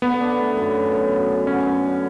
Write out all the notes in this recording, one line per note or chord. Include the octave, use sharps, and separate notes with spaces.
D3 B3
D4
A3
F#2
F#2
F#2
F#2
F#2
D3 C#4
F#2
D4